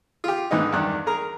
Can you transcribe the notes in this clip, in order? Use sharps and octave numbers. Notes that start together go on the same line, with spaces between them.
F4 G4
G#2 D3 E3 B3 D#4
E2 G2 D#3 D4 F#6
G#4 A#4 A#5